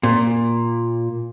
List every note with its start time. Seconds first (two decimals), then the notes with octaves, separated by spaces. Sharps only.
0.03 A#2